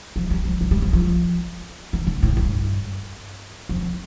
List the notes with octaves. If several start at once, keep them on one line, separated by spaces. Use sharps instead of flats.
F3
G3
F3
G3
G3
F3
F3
E3
D3
A2
G2
F2